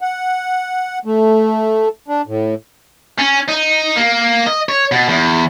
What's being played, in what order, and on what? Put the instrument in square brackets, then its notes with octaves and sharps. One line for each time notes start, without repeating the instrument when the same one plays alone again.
[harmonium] F#5
A3
D4
A2
[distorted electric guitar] C#4
D#4
A#3
D#5
C#5
B2
E2